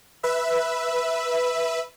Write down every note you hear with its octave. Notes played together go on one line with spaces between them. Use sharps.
B4 E5